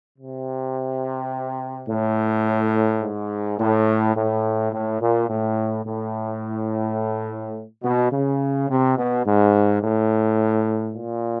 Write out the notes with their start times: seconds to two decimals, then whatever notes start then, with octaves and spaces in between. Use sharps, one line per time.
0.18 C3
1.88 A2
3.01 G#2
3.59 A2
4.15 A2
4.72 A2
5.01 A#2
5.28 A2
5.86 A2
7.83 B2
8.12 C#3
8.69 C3
8.97 B2
9.26 G#2
9.82 A2
10.96 A#2